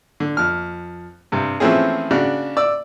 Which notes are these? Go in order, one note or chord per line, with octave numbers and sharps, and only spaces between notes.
D3
F2 F6
G2 C3
E3 F3 A3 C4 C#4 G#4
C#3 D4 F#4
D5 E6